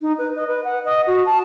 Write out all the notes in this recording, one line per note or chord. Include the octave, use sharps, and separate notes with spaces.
D#4
B4
D#5
B4
F#5
D#5
F#4
A5